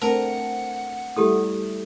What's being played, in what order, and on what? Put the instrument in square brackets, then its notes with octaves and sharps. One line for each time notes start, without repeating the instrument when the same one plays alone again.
[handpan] A3 C4 D4 [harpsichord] A#4 [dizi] F#5 [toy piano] A5
[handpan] G3 A3 E4 [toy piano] G4 A4 D#6